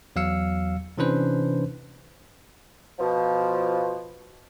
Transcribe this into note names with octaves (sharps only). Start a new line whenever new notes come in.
E2 F#3 F5 E6 C#7
C3 E3 C#4 D4 B4 C5
B2 F3